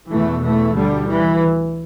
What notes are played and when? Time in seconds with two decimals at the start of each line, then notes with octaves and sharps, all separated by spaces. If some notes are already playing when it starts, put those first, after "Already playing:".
0.11 E2 B2 E3 A3
0.43 E3 A3
0.75 D2 D3 G3
1.08 E3